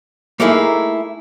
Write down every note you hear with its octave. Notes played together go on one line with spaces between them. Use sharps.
A3 A#3 D#4 E4 G#4 A#4